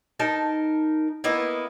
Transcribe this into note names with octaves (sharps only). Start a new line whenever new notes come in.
D#4 A#4 A5
A#3 B3 E4 D#5